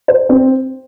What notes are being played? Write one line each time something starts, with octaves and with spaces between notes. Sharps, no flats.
C5
C4